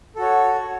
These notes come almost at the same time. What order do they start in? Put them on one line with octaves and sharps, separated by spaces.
A4 F#4 C#5